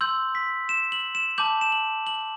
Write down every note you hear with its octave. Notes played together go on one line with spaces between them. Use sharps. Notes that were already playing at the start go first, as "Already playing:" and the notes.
C6 E6 G6 F#7
B6
E7
F#7
E7
A5 D6 G6 F#7
E7
F#7
F#7